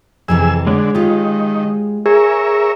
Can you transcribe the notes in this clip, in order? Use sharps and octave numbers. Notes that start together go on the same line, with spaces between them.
F2 C3 E3 G#4 E6
D3 G#3 G#4 C#5
D#3 F4 G4
G#4 A#4 C#5 E5